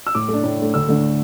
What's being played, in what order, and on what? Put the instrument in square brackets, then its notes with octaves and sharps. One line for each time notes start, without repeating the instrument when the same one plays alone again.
[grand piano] E6
A2 D6
A3 D4
A2
A3 D4
D2 E6
D3 A3